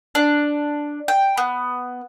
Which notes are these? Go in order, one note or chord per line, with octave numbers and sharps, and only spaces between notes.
D4
G5
B3